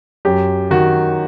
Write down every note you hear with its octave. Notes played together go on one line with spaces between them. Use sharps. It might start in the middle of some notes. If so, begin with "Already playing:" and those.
F#2 G4
D#3 F#4